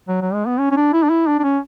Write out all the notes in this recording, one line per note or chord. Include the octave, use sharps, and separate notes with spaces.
F#3
F#3
G#3
B3
C#4
C#4
D4
E4
D4
E4
D4
D4
C#4